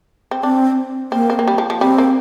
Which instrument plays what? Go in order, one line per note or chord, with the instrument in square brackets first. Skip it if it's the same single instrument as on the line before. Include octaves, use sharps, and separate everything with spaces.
[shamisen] C4
[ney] C4 [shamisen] D4
[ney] A#3 [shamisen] C4
[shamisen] C4
A#3
G3
F3
F3
[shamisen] G3 [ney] C4
[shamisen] A#3